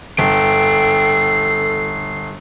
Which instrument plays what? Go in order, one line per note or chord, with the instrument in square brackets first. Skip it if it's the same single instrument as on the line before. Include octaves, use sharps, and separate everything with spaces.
[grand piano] G1 [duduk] A4 [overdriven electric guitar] G5 [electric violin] C7